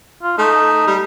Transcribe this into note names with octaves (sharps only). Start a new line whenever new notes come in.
F4
A3 D#4
G3